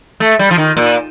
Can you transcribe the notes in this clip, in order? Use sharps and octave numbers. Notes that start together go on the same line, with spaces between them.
A3
G3
F3
D#3
A#2